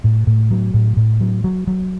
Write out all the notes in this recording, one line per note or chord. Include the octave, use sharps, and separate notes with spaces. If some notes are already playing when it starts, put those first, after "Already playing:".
A2
A2
F#3
A2
A2
F#3
F#3
F#3